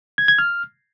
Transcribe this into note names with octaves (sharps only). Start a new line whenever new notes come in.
G#6
G#6
F6